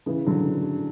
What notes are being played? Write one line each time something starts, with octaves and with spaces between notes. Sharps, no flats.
C#3 E3
D3 F#3